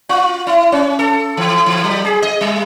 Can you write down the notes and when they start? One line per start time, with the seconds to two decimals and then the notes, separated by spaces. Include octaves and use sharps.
0.09 F4
0.47 E4
0.72 C#4
0.99 A4
1.37 E3
1.66 E3
1.84 F#3
2.05 G#4
2.22 D#5
2.41 G3